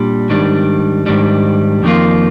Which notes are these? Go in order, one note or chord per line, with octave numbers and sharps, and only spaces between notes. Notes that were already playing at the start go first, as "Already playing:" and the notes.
Already playing: A#2 G3 D4
G#2 D#3 G3 D4
G#2 D#3 G3 D4
F2 D#3 G3 A#3 F4